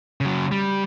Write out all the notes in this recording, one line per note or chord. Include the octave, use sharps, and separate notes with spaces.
C#3 F#3
G3